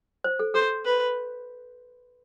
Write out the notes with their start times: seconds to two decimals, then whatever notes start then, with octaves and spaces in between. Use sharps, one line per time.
0.24 C5
0.39 A4
0.54 A4 C5
0.85 B4